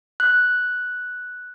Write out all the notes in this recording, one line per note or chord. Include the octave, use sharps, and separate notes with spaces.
F#6